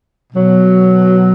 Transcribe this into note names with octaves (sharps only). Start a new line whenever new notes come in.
B2 F#3